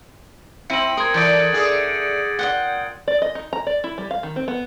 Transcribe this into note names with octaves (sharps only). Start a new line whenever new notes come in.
C4 E4 C#7 D#7 F#7
A#4 C6 D#6 G#6
E3 A3 D4 A4 G6 A6 D7
D3 G#4
A#2 B3 F#5 G5
D5
D#5
D#4
A#5
D5
E4
G3
F5
D#3
C4
B3